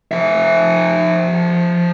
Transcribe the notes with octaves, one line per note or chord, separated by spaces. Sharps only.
F3 E5